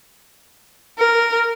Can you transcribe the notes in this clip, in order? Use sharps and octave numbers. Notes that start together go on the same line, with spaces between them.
A#4